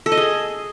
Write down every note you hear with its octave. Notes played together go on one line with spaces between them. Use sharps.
A4
D#5
G#4